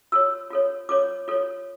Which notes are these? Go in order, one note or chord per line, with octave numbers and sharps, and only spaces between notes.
F4 A4 C#5 E6
F4 A4 C#5
F4 A4 C#5 D6
F4 A4 C#5